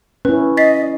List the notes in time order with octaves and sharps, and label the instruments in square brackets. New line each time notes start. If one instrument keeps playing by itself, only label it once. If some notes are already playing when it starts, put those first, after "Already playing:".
[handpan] C#4 E4 [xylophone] B4
[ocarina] D#5 [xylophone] A6 B6 C7